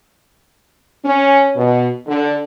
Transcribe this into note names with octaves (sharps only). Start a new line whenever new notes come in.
C#4
B2
D3